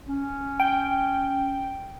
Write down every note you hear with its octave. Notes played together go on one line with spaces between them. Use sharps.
C#4
G5